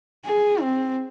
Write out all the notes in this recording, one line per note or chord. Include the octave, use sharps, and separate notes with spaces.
G#4
C4